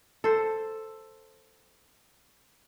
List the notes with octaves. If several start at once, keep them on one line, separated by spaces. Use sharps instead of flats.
A4 C5